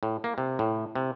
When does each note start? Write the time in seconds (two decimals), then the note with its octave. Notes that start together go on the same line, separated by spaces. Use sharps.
0.03 A2
0.24 A#3
0.38 C3
0.59 A2
0.95 C3